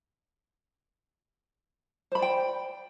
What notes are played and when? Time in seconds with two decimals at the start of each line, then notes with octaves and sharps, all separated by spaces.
2.12 C5
2.15 B5
2.19 D5
2.22 G5